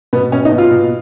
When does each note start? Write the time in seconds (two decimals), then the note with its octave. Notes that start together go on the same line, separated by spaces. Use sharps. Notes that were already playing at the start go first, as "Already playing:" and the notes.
0.13 B2 B3
0.32 B2 C#4
0.45 D#4
0.52 B2
0.58 F4
0.71 B2